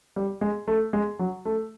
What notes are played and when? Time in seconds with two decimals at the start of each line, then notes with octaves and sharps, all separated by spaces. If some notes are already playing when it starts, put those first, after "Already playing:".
0.16 G3
0.41 G#3
0.68 A3
0.93 G#3
1.19 F#3
1.45 A3